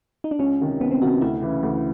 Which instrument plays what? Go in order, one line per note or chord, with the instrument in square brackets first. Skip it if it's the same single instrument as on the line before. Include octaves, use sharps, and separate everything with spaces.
[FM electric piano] D#4
D4
[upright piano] C#2 [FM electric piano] C#4
[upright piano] C3 D#3
[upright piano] C#2 [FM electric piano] B3
[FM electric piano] C4
[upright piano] C3 D#3 [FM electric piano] F#4
[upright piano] D2 [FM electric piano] E4
[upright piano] C#3 E3
D2